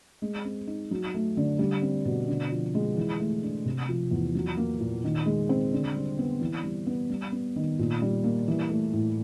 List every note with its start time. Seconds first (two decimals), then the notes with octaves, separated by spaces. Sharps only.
0.22 G#3
0.45 C4
0.67 D#4
0.91 F#3
1.14 A3
1.37 D3
1.59 G3
1.82 C4
2.05 B2
2.28 D3
2.52 F3
2.75 G#3
2.97 E3
3.19 A3
3.43 D4
3.65 C3
3.89 F3
4.11 E2
4.35 F#3
4.57 A#3
4.80 A#2
5.04 D#3
5.26 G#3
5.49 C4
5.73 D3
5.95 G3
6.19 B3
6.41 E3
6.63 G3
6.87 B3
7.10 G3
7.32 B3
7.56 D#3
7.79 A#2
8.02 G3
8.24 A#3
8.48 E3
8.70 A3
8.93 A2